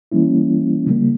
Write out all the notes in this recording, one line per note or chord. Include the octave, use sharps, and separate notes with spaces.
E3 G3 A#3 C#4 E4
C#3 G3 A#3